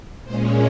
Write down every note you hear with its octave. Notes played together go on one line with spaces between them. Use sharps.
A#2 G#3 C#4 C5